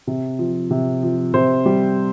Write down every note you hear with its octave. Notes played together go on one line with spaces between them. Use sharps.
C3
F3
C3
F3
C3 C5
G3